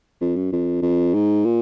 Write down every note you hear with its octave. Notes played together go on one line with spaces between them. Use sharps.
F2
F#2
F2
F2
G#2
A#2